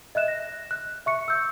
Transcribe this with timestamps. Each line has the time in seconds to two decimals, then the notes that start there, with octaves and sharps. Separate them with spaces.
0.15 D#5 E5 F#6 E7
0.28 A#6
0.71 F#6
1.06 E5 C#6 C#7
1.28 E6 G6